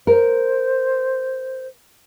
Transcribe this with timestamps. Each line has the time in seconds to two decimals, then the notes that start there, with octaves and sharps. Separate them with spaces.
0.07 A#4 C5